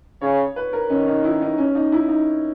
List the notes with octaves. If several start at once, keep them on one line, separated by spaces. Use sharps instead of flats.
C#3 C#5
B4
A#4
D#3 C#4
D#4
E4
D#4
C#4
D#4
E4
D#4